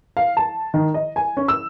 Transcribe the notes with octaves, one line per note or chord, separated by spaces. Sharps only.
F5
A5
D#3
D#5
G#5
C#4
E6